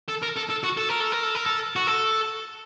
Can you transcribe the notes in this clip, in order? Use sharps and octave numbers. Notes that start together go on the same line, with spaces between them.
A4
A#4
A4
A4
F#4
A4
A#4
A4
A#4
A4
A#4
A4
F#4
A4